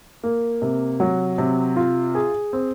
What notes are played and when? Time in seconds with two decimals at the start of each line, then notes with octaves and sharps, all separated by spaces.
0.23 A#3
0.62 C3
1.00 F#3
1.38 C3
1.76 F4
2.15 G#4
2.53 C4